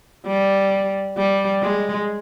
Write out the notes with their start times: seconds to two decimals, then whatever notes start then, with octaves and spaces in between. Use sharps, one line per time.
0.27 G3
1.18 G3
1.62 G#3